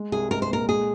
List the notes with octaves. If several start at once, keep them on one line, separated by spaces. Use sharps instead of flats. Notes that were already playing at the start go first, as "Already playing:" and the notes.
Already playing: G#3
C2 G#4
G#3 A#4
C5
A#2 A#4
G#3 G#4